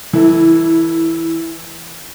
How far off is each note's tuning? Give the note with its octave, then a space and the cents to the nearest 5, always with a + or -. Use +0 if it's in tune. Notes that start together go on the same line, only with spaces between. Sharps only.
E3 +0 E4 -20 A4 +30